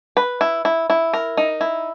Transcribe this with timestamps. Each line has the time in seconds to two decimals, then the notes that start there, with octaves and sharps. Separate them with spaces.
0.17 B4
0.41 E4
0.65 E4
0.90 E4
1.13 A#4
1.37 D#4
1.61 E4